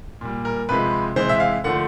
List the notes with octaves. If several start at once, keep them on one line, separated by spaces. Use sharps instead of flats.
A#2 G3
A#4
C3 F3 G#3 B4
C3 E3 G#3 C5
E5
F5
D3 F3 A3 F#5